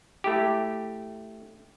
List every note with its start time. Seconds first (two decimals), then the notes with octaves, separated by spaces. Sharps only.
0.24 A3 E4 G4